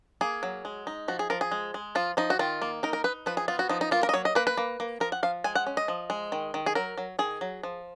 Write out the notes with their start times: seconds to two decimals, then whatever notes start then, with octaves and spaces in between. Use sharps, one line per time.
0.21 A#3 G#4
0.43 F#3
0.65 G#3
0.87 D#4
1.08 F3 F#4
1.19 G#4
1.30 F3 A#4
1.41 G#4
1.52 G#3
1.74 G#3
1.95 F3 F4
2.17 F3 D#4
2.30 F#4
2.39 D#3 F4
2.62 A#3
2.83 D#4 A#4
2.93 A#4
3.04 D#4 B4
3.26 F3 B4
3.37 G#4
3.48 B3 F4
3.59 F#4
3.69 F3 D#4
3.81 D#4
3.91 A#3 F4
4.03 A#4
4.09 D#5
4.14 F#3 C#5
4.25 D#5
4.35 A#3 B4
4.47 B4
4.57 A#3
4.80 A#3
5.00 F3 A#4
5.12 F#5
5.23 F3 F5
5.44 G#3 G#5
5.55 F#5
5.66 C#4
5.77 D#5
5.88 F3
6.10 G#3
6.32 D#3
6.54 D#3
6.66 G#4
6.75 F#3 A#4
6.98 F#3
7.19 D#3 G#4
7.41 F#3
7.63 F3